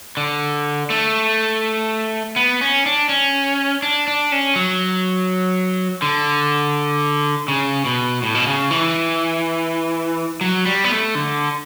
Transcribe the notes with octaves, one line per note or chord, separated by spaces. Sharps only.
D3
A3
B3
C#4
D4
C#4
D4
D4
C#4
F#3
D3
C#3
B2
A2
B2
C#3
E3
F#3
G3
B3
A3
D3